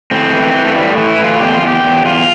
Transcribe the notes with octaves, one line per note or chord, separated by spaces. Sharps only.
A2 C4
E3
E3
A3
A2 G3
E3
E4
A2
F4
E2 G4
F4
E2 G4
E2
E2 F4